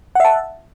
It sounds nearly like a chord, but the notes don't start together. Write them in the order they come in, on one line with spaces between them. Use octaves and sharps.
F#5 E5 A5